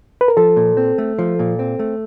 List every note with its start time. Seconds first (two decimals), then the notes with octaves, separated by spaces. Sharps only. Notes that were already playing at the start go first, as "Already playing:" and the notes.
0.21 B4
0.28 A#4
0.37 F3 A4
0.56 A#2
0.77 C4
0.98 A3
1.18 F3
1.39 A#2
1.59 C4
1.79 A3